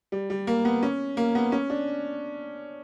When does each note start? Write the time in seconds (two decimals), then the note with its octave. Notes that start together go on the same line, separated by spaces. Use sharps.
0.12 G3
0.30 G3
0.47 A#3
0.65 B3
0.83 C#4
1.17 A#3
1.35 B3
1.52 C#4
1.70 D4